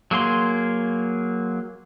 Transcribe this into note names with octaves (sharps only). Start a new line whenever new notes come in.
F#3 A#3 G#4 C6